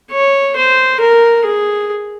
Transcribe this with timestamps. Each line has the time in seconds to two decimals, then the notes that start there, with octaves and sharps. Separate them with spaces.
0.12 C#5
0.56 C5
1.01 A#4
1.45 G#4